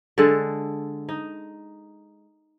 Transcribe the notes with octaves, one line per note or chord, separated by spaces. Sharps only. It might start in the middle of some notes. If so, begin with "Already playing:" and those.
D3 G#3 A4
D#4